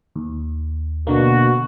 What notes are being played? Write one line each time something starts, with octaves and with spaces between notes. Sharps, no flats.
D#2
B2 D3 A#3 F#4